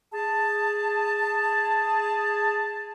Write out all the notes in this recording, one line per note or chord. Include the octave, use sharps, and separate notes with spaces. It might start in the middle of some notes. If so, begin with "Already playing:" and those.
G#4 A5